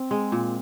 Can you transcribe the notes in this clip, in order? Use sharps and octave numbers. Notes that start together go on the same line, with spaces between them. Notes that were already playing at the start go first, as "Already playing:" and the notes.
Already playing: C4
G#3
A#2